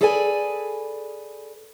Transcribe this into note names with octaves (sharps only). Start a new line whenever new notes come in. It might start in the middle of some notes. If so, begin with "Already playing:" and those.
G#4 A4 B4 D5 G5 G#5